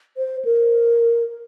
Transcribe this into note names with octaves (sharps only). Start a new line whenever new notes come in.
C5
A#4